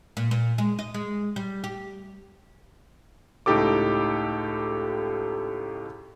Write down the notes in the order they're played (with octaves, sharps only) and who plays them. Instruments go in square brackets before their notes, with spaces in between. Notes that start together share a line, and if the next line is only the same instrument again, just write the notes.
[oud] A#2
A#2
G#3
D#5
G#3
G3
G4
[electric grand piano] C#2 A2 D#4 G4 A4 D6